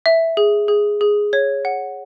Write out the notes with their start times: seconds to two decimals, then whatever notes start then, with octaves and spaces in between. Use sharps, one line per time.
0.06 E5
0.37 G#4
0.68 G#4
1.01 G#4
1.33 C#5
1.65 F#5